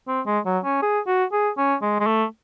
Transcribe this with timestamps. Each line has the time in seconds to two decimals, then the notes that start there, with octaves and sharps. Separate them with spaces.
0.08 C4
0.26 G#3
0.46 F#3
0.64 C#4
0.82 G#4
1.07 F#4
1.32 G#4
1.58 C#4
1.82 G#3
2.00 G#3
2.07 A3